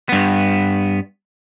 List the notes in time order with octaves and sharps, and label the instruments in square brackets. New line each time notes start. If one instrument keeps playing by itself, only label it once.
[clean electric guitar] G2 B3